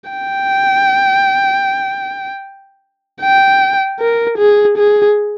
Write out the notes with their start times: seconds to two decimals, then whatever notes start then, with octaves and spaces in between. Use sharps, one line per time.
0.10 G5
3.22 G5
4.00 A#4
4.38 G#4
4.78 G#4